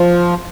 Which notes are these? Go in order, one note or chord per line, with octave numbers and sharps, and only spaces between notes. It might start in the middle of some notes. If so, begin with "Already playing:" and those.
Already playing: F3